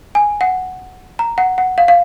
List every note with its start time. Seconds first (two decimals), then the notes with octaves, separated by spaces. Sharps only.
0.15 G#5
0.41 F#5
1.19 A#5
1.38 F#5
1.58 F#5
1.78 F5
1.88 F5